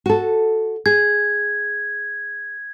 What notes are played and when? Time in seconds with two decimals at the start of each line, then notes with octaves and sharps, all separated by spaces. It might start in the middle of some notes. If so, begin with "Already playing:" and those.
0.06 F#4 A4
0.86 G#4 G#6